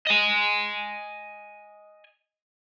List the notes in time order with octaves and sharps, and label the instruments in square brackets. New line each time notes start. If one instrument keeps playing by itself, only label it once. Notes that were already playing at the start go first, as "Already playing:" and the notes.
[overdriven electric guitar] D#5 G#5